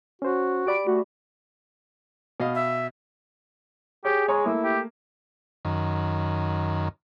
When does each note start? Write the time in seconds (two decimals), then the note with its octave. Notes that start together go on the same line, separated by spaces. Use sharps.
0.22 C#4 F#4 C5
0.67 G4 D5 B5 D7
0.87 A3 F#4
2.40 B2 D#5 F5
2.55 E5
4.05 G4 G#4 C#5
4.28 G#3 C#5 A#5 C#6
4.46 A3 A#3 E4
4.64 G4
5.65 F#2 D#3